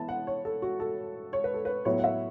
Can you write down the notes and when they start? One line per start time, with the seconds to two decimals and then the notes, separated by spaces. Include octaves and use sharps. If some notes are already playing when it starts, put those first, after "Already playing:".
Already playing: E3 B3 E4 A5
0.09 F#5
0.27 C#5
0.45 A4
0.62 F#4
0.80 A4
1.33 C#5
1.44 B4
1.54 A4
1.65 B4
1.85 A2 F#3 B3 E4 C#5
1.99 F#5
2.04 E5